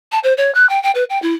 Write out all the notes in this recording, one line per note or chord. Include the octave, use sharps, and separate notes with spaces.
A5
C5
C#5
F#6
G5
G5
B4
G5
E4